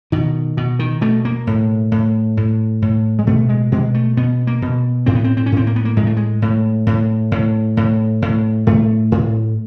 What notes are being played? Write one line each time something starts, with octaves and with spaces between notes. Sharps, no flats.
B2 D#3
B2
D#3
B2 A3
A#3
A2
A2
A2
A2
G#3
B2 A3
G#3
B2 G#3
A3
B2 B3
A#3
B2
A2 C4
B3
C4
C4
C#4
A2 C4
A#3
B3
A#3
A2 G#3
A3
G#3
A2
A2
A2
A2
A2
A2 A3
A2